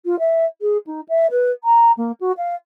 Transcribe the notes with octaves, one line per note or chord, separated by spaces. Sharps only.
F4
E5
G#4
D#4
E5
B4
A#5
A#3
F#4
F5